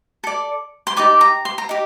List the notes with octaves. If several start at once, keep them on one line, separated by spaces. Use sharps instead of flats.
A4 D5
C6
D#4 G4 D5 D6
A#5
C6
A#5
D#4 G4